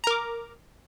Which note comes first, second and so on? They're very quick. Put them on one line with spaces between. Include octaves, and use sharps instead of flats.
A#5 A#4 D6